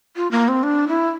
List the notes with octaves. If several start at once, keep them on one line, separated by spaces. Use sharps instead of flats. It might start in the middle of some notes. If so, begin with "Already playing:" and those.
F4
A#3
C4
D4
E4